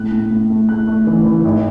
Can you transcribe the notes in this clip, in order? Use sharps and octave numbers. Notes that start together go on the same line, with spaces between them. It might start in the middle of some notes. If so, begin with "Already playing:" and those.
Already playing: A2 F#6
A2
A2
A3
A2 F#6
A3
E3
E3
G#1